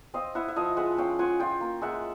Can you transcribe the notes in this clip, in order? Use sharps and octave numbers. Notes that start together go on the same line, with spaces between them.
C4 D#5 F5
E4 E5 F#5
E5
F3 D#5 F5
G#3 E5 F#5
C#4 F5 G5
F4 F#5 G#5
F4 F5 G5
A#3
G#3 E5 F#5